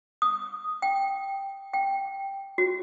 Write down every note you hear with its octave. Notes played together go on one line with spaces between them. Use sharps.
D#6
G5
G5
F#4